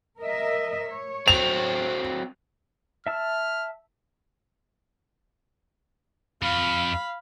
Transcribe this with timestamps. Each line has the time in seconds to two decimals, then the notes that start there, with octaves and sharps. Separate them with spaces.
0.19 A#4 D#5 E5
0.88 C#5
1.28 F#3 C4 F7
3.07 E5 A5 E6 F6
6.42 F2 F5 B5